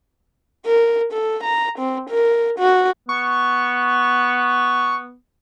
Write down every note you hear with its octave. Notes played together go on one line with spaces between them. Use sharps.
A#4
A4
A#5
C4
A#4
F#4
B3 C#6